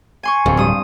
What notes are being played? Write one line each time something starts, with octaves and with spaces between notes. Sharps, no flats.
G#5 C6 C#6
D1 F2
G2 D#6